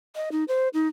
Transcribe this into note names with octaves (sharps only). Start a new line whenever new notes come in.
D#5
D#4
C5
D#4